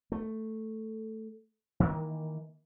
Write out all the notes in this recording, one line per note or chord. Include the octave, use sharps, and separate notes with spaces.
A3
D#3 E3 A#3